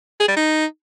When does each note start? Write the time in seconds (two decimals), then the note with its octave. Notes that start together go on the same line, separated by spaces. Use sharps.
0.20 G#4
0.28 G3
0.36 D#4